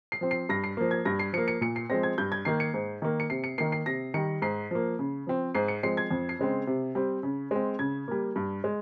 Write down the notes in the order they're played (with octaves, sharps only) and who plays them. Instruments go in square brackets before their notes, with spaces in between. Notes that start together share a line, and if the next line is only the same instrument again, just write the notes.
[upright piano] C7
F3 C4
C7
G2 A#6
C7
F3 A#3
G#6
G2 A#6
C7
F3 A#3 C#7
C#7
A#2 C#7
C7
F3 G#3 C4 A#6
G#6
G2 G6
G#6
D#3 A#3 C7
C#7
G#2
D#3 A#3
C#7
C3 C7
C#7
D#3 A#3 C7
C7
C3 A#6
D#3 G3 C#7
G#2 C7
F3 A#3
C#3
F3 C4
G#2 C7
C#7
F3 G#3 C4 C7
G#6
F2
C7
C#3 G#3 C4
C3
G3 C4
C#3
G#3 C4
C#3 G#6
G3 A#3
G2
G#3